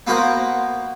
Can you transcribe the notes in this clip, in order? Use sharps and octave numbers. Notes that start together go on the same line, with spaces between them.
A#3 B3 F#4 A#4 C5